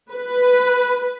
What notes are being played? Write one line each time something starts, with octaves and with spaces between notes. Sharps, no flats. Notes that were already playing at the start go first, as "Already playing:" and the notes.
B4